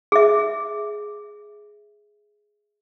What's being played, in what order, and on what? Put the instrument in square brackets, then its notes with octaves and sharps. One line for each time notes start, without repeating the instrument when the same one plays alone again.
[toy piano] G#4 E5